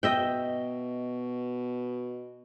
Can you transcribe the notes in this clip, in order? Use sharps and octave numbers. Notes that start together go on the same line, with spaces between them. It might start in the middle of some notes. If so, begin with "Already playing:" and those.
B2 D#5 E5 G5